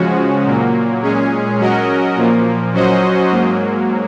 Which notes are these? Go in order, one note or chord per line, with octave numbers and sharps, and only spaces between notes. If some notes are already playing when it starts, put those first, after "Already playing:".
Already playing: C#3 F3 G#3 C#4 F#4
A#2 F#3 A#3
A#2 G#3 C#4 G#4
F#3 C#4 F#4 A#4 D#5
A#2 F3 A#3
F#3 C#4 F#4 C5 D#5
G#2 F#3 A#3